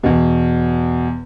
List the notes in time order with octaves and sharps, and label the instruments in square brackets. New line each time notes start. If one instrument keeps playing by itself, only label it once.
[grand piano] E2 B2